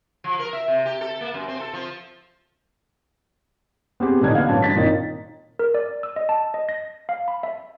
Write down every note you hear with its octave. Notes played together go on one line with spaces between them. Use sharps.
F3
A#4
E5
C3
G4
A4
A#3
F#2
C4
A4
F3
B3 C4 G4 G#4
D#1 A1 D3 D4 D#4 G#6
B3 F5
A1 F#2 A5
G1 A6 B6
A#2 D#3 C4 D#4
A#4
D5
E6
D#5
A5
D#5
A#6
F5
B5
E5